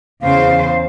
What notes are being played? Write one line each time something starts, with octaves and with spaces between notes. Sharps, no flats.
E2 C#3 C5 F5